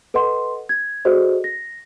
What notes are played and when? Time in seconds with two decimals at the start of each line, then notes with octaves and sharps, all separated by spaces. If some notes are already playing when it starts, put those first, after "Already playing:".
0.14 A4 B4 D#5 F#5 C6
0.69 G#6
1.05 F#4 G#4 A4 C5 D5 D#5
1.44 A#6